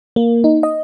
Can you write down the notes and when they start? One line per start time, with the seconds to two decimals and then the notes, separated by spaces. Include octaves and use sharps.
0.16 A#3
0.44 D#4
0.63 D#5